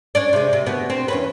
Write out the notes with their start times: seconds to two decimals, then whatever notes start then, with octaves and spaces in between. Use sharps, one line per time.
0.15 C#4 D4 D5
0.33 C3 G#3
0.53 C3
0.66 D2 B2 B3
0.90 C4
1.08 E2 C#4 B4